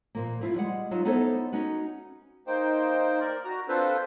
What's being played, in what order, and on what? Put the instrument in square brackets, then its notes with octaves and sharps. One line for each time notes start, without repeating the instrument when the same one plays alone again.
[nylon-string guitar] A#2 F3 A#3
F3 E4 F4
G3 G#3 F#5
F#3 D#4 F4
B3 D#4 E4 A4 C5 C#5
C#4 D#4 F#4 B4
[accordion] A#3 D#4 C5 G5
A#4 D5
F#4 A#5
C4 D4 F4 A4 B4 C5